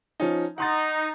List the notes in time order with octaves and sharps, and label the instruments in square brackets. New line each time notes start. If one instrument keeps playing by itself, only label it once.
[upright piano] F3 C#4 D#4
[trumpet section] D#4 [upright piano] F#5 C6 A6